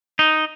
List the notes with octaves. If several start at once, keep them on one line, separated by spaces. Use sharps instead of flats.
D#4